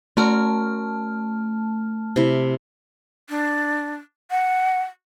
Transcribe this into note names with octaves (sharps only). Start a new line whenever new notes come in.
A3 C#4 F#4 A#4 A5 F6
C3 E4
D4
F#5